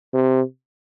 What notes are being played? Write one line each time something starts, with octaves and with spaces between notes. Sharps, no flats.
C3